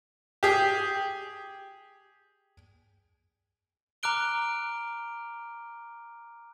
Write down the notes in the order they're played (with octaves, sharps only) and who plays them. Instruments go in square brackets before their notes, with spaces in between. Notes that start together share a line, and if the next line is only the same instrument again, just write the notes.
[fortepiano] G4 G#4
[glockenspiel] A#5 D6 F6 F#6 D7 G7